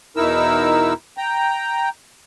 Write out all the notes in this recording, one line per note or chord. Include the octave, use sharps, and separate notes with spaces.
E2 B2 D#4 E4 A#4 E6
G5 A#5